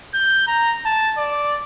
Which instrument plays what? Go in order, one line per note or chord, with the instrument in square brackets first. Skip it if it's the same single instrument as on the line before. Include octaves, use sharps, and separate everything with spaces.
[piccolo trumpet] G6
A#5
A5
D5